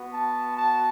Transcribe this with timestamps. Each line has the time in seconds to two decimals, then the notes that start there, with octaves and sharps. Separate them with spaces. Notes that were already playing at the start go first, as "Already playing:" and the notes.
Already playing: B3 F#4
0.13 A5
0.58 A5